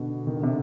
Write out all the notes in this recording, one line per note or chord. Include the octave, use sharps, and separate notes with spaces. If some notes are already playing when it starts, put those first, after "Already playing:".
Already playing: B2 D3
D#3
D3
C3 D#3